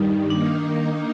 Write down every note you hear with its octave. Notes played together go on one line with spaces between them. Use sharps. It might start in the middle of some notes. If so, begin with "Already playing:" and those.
Already playing: G2 D#3 G3 D#4
D#3 A#3 D4 D#4